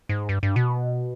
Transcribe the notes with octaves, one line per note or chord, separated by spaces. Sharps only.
G#2
G2
G2
B2